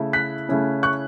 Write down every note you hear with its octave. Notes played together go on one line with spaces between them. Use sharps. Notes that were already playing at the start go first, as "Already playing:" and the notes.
Already playing: C#3 A3 E4
F#6 B6
C#3 A3 C#4 E4
C#6 F#6